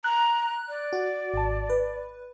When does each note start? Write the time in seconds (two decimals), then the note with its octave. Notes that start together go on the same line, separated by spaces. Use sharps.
0.04 A#5 F#6
0.69 D5
0.93 F#4
1.34 G#1 A5
1.70 B4